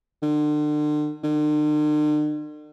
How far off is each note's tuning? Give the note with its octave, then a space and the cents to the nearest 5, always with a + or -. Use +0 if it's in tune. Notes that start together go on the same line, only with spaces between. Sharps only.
D3 +40
D3 +45